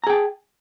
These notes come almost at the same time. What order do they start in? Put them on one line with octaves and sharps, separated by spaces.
A#5 G#4 G5 A5